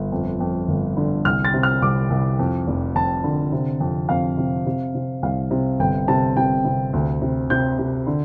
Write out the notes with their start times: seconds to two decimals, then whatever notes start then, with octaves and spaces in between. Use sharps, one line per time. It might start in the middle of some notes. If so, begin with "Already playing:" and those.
Already playing: G1
0.12 F2
0.40 F2
0.68 G1
0.97 D3
1.25 C2 F6
1.45 A6
1.54 C3
1.63 F6
1.82 C2 D6
2.10 C2
2.39 F2
2.67 F1
2.95 F2 A5
3.24 D3
3.52 C3
3.80 F2
4.09 F2 F5
4.38 C3
4.66 C3
4.95 C3
5.22 C2 F5
5.51 C3
5.80 G1 G5
6.08 C3 A5
6.36 C3 G5
6.65 C3
6.93 D2
7.22 C3
7.50 C3 G6
7.78 C3
8.07 D3